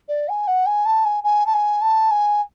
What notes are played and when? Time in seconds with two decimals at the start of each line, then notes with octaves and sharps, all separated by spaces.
0.08 D5
0.28 G#5
0.47 F#5
0.66 G#5
0.85 A5
1.05 G#5
1.23 G#5
1.46 A5
1.54 G#5
1.81 A5
2.11 G#5